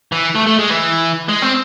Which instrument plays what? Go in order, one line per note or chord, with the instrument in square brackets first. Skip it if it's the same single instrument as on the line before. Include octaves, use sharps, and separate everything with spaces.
[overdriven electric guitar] E3
A3
A3
G#3
E3
G#3
C4